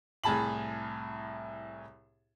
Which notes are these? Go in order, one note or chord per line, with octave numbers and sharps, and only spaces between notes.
C2 A2 G#4 A5 B5 F#7